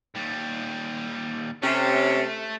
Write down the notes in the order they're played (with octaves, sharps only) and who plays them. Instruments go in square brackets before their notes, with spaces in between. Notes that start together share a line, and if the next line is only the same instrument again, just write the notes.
[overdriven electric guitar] D#2 G3
[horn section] C3 C#4 [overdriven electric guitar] A3